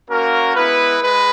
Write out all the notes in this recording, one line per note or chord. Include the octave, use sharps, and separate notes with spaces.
A#3 C#4 F#4 A#4
G#3 B3 E4 B4
G#3 B4